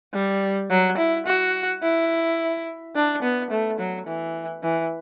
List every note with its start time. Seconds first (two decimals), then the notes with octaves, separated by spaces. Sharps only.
0.14 G3
0.70 F#3
0.98 E4
1.26 F#4
1.82 E4
2.95 D4
3.22 B3
3.51 A3
3.78 F#3
4.06 E3
4.63 E3